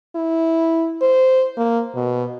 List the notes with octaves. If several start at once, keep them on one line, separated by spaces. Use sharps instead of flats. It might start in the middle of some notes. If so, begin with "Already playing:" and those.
E4
C5
A#3
B2